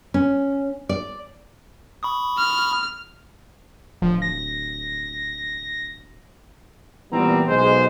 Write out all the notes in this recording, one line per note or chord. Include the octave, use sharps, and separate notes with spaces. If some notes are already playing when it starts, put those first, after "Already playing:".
C#4
D5
B5 C#6 D#6
F6
D1 F3
A#6
A#2 E3 G3 B3 C4 A#5
B1 G#3 C5